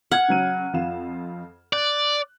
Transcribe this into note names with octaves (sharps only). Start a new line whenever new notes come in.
F#5 F6 G#6
C#3 F#3 D#7
F2 F4 E7
D5 F#6